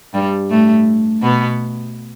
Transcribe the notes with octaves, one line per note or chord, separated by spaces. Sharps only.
G2 G3
A2 A3
B2 B3